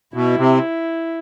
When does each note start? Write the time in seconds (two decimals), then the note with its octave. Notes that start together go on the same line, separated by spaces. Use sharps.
0.14 B2 E4
0.37 C3